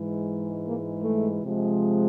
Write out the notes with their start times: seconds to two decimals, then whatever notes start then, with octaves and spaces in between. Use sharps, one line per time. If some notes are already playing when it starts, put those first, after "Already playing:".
Already playing: G#2 E3 G#3
0.66 A#3
1.03 A3
1.43 C3 F3 G#3